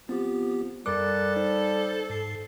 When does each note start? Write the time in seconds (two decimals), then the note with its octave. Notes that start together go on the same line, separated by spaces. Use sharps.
0.09 F3 B3 C4 G4
0.86 F#2 G3 A4 A#4 D6 F#6 A6
1.36 D#4 C5
2.10 G#2 C7